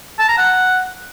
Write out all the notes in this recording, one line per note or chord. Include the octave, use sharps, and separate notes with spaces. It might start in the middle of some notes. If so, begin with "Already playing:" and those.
A5
A#5
F#5